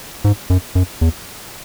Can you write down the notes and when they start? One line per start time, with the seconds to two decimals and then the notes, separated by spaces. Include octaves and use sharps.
0.25 G#2
0.50 F#2
0.75 F#2
1.01 E2